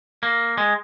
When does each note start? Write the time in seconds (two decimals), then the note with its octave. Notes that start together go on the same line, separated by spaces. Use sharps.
0.23 A#3
0.58 G#3